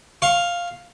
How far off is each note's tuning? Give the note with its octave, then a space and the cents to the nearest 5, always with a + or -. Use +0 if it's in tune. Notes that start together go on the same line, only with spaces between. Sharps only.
F5 +0 C#6 -40